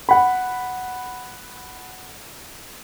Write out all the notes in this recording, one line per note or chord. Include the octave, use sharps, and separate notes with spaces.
F#5 B5